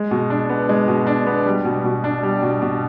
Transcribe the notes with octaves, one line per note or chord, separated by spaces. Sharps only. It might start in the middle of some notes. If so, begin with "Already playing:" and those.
Already playing: G#3
B2
D4
B3
G#3
B2
D4
B3
G3
B2
B2
D4
G3
B2
B2